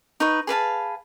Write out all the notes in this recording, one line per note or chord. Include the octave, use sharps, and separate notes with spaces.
D#4 B4 C#6
G#4 B4 F5 A5